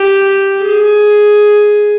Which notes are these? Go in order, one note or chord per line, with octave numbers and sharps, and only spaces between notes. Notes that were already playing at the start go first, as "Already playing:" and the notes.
Already playing: G4
G#4